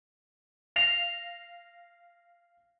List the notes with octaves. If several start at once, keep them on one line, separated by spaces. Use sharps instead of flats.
F5 A#6 C7 F7